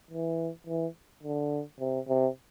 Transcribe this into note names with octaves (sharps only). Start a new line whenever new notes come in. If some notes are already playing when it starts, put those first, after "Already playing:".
E3
E3
D3
C3
C3